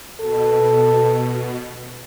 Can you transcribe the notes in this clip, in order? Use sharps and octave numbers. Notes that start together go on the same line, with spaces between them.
B2 A4